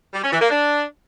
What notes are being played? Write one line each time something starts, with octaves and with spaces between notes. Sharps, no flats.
G3
C#4
E3
A#3
D4